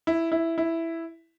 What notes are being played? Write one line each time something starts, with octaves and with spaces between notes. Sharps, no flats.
E4
E4
E4